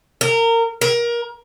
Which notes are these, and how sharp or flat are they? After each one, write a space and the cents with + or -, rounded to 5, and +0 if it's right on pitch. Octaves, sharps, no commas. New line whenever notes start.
A#4 -25
A#4 +25